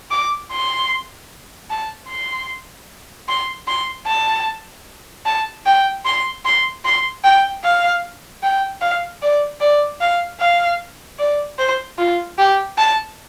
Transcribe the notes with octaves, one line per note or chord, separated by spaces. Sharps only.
D6
C6
A5
C6
C6
C6
A5
A5
G5
C6
C6
C6
G5
F5
G5
F5
D5
D5
F5
F5
D5
C5
F4
G4
A5